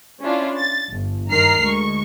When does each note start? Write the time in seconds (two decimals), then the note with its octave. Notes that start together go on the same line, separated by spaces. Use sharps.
0.21 C#4 D4 E4 F4
0.57 A6
0.90 G1
1.29 G2 D#3 A#4 A#5 F6 C7
1.61 D2 G#3 C#6